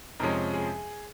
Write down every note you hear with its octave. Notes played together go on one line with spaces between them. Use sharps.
F2 C3 F3 G#3 C#4 A#4
G#4